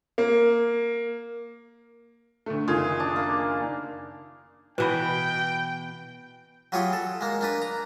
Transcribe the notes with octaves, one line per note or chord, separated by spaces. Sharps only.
A#3
D2 A3
F#1 D#3 F4 G#4
D4
A#3
B2 E3 B4 D#5 G5 B5
F#3 G3 F4 G4 G#4 C#5
A4
G#3 A#3
A#3 D4 B4
A#5